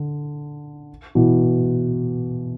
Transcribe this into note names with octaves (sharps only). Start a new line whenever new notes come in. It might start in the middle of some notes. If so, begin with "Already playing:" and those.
Already playing: D3
B2 E3